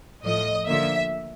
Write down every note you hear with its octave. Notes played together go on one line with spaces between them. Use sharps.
A2 F3 A3 D#5
D3 F3 A#3 E5